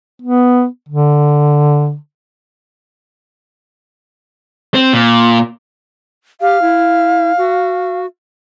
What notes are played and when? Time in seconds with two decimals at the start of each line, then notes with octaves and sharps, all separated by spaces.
0.22 B3
0.89 D3
4.74 C4
4.93 A#2
6.41 G4 F5
6.62 E4
7.38 F#4